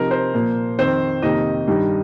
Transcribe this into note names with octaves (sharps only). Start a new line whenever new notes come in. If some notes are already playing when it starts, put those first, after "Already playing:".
Already playing: C3 F3 D#4 A#4
C5
A#2 F3 A#3
F2 D#3 C4 C5
F2 C3 D#3 A#3 D#4 D#5
G2 D#3 G3 D#4